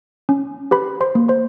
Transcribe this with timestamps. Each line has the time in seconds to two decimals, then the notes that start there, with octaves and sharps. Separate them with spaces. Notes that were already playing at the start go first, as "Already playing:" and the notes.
0.29 C#4
0.71 G4 B4 B5
1.01 C5 C6
1.15 A#3
1.29 C5 C6